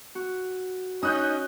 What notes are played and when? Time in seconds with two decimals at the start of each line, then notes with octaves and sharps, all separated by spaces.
0.15 F#4
1.03 C#4 D#4 D#5 D#6 F#6 G6